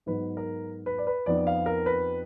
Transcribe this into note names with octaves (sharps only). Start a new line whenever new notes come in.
G#2 F#3 B3 D#4 B4
A#4
B4
D5
B4
F2 F3 B3 D#4 D5
F5
A#4
B4